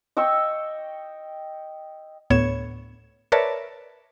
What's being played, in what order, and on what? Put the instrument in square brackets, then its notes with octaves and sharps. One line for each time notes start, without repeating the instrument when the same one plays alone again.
[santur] D#5 G5 C#6 E6
[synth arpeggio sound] D2 A2 B3 C#5 G#6 E7
A#4 B4 C#5 D5 E5 A5